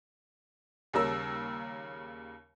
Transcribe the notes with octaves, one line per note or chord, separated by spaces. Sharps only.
D#2 C#3 G3 A#4 E6